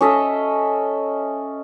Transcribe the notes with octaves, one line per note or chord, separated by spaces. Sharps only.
C#4 A4 D#5 E5